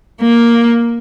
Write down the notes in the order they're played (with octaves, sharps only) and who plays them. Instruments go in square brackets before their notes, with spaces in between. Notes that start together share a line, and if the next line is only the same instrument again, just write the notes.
[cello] A#3